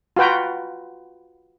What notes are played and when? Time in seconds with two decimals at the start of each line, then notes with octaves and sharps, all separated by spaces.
0.16 F4 F#4 B4 G5 A#5